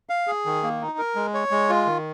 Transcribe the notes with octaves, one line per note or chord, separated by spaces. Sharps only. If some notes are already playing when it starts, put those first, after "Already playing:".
F5
G#4
D#3
A#3
D#4
A#4
G#3
C#5
G#3
F4
D#3